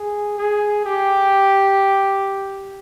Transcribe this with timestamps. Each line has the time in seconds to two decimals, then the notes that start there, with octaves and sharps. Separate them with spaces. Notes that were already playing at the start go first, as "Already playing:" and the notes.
Already playing: G#4
0.38 G#4
0.85 G4